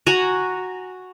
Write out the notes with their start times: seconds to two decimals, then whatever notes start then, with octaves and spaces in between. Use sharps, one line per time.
0.07 F#4 G#5 A#5